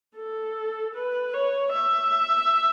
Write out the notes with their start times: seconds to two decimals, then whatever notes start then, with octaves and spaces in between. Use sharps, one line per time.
0.17 A4
0.95 B4
1.34 C#5
1.73 E5